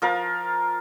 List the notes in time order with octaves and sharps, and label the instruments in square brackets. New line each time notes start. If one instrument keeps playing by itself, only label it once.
[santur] F3 A#4 F5